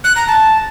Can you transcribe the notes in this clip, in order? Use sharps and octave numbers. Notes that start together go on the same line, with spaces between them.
F#6
A#5
A5